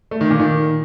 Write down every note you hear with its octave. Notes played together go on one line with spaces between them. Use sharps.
A3
D#3
A#2
D#3